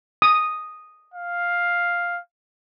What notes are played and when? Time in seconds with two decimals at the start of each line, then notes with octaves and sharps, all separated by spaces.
0.22 D#6
1.14 F5